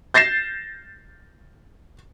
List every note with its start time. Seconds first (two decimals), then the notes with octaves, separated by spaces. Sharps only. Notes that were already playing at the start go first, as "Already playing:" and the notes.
0.14 G6 A6 A#6 C7 E7